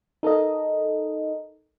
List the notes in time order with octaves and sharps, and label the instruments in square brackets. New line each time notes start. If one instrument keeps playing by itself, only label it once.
[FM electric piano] D#4 A4 A#4 D#5